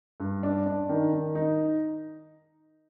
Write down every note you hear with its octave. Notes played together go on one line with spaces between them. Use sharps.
G2
D4
D4
D#3
D#3
D#4